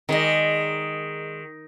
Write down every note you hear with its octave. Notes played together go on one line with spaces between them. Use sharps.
D#3 G#3 D5 D#5